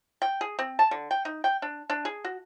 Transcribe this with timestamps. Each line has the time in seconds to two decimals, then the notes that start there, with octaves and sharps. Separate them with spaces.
0.22 G5
0.41 G#4
0.59 C4
0.79 A5
0.91 D3
1.11 G5
1.25 D#4
1.44 G5
1.62 D4
1.90 D4
2.05 G#4
2.25 F#4